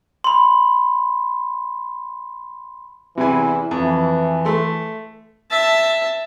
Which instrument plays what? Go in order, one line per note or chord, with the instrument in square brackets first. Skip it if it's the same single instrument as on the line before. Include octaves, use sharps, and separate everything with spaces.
[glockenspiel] B5 C6
[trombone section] E2 E3 E4 [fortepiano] C3 G#5
[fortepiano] F2 [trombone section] E3
[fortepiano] A3 A4 C6
[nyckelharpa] E5 A5